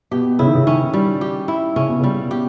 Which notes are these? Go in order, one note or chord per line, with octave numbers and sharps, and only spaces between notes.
B2 G4
C#3 E4
D#3
C#3
D#3 C#4
G3
G4
E4
C#3 C#4
B2
C#3 G3
B2
G4